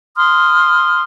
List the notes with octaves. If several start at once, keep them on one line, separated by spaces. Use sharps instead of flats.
C6 D#6 F6